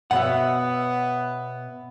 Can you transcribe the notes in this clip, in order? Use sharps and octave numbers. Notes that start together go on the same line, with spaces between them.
B2 B3 C#5 E5 F#5